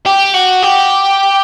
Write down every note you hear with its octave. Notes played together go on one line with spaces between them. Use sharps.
G4
F#4
G4